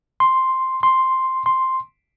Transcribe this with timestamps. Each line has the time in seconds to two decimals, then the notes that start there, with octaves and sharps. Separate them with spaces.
0.20 C6
0.83 C6
1.46 C6